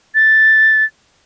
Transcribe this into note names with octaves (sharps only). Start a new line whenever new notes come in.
A6